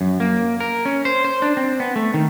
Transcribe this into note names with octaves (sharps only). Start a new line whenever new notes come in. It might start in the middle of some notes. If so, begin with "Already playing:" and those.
F#2
A#3
A#4
C#4
C5
C5
D4
C4
B3
A3
D#3